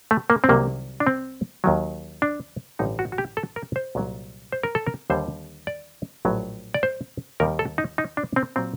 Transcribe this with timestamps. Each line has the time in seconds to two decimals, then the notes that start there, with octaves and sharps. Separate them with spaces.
0.11 A3
0.30 A#3
0.44 C4
0.49 C2 C3 D#3 F#3 A#3
1.00 D4
1.07 C4
1.64 D#2 D#3 F#3
2.22 D4
2.79 A1 G2 D3 D#4
2.99 F#4
3.12 F#4
3.18 G4
3.37 A4
3.56 A#4
3.76 C5
3.95 C2 A#2 F#3
4.52 C5
4.63 A#4
4.75 A4
4.87 A#4
5.10 D#2 D3 G3 C5
5.67 D5
6.25 A#1 A2 F#3
6.74 D5
6.83 C5
7.40 D#2 D#3 G3 A#4
7.59 A4
7.78 D#4
7.98 D#4
8.17 D4
8.36 C4
8.56 A#2 F#3 C4